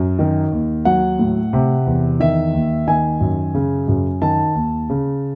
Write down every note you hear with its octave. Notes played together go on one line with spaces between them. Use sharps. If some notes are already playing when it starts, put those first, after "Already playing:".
Already playing: F#2
D#3
D#2
F#3 F#5
A2
C3
E2
D#3 E5
D#2
D#3 G#5
F#2
C#3
F#2
D#3 A5
D#2
C#3